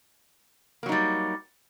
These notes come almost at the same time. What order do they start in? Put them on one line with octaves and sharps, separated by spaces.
A#3 F#3 D#4 G3